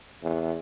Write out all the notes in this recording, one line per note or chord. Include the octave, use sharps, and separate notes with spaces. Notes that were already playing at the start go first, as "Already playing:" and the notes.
E2